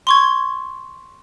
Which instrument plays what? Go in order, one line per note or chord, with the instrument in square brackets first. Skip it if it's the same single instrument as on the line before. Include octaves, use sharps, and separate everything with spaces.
[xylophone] C6 C#6 G#6